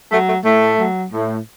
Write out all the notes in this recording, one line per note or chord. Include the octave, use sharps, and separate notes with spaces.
F#3 A3
A3
A2 A3
F#3
A2